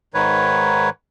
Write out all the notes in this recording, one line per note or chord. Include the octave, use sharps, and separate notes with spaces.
G#2 D#3 B4 C#5